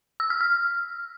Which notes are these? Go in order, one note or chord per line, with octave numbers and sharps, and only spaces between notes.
E6
F6
F6